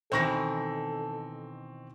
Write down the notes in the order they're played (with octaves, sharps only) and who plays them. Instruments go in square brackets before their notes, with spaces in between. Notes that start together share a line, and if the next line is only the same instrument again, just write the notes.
[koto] B2 D#3 E3 [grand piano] C4 C#6 A#6 [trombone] A4